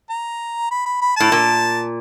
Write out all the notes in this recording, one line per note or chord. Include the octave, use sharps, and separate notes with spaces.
A#5
B5
B5
B5
A2 A5
A#2